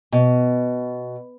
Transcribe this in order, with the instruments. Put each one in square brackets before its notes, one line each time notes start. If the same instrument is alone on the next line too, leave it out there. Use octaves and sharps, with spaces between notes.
[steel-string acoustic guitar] B2